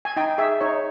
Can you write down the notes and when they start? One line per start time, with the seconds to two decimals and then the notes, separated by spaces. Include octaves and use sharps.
0.05 G#5
0.16 D#4 G5
0.38 G#4 E5
0.61 D#4 C#5